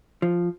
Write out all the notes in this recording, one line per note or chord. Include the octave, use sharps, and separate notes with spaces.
F3